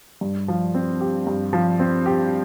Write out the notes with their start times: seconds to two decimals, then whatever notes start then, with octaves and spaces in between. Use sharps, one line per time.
0.21 G2
0.48 F3
0.74 C4
1.01 G4
1.27 G2
1.53 F3
1.79 C4
2.06 G4